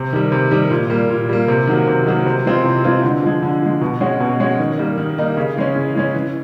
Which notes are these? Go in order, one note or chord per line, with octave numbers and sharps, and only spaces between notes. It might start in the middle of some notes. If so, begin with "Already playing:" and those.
Already playing: C3
D#3 G3
C3
D#3 G3
A#2
G3 A#3
A#2
G3 A#3
C3
D#3 F#3 A#3
C3
D#3 F#3 A#3
C3
E3 G#3 C4 F4
C3
E3 G#3 C4 F4
D3
F3 G#3
D3
F3 G#3
B2
G#3 C#4 F#4
B2
G#3 C#4 F#4
D#3
G3 A#3 D#4
D#3
G3 A#3 D#4
C#3
E3 G#3 C#4
C#3
E3 G#3 C#4
E3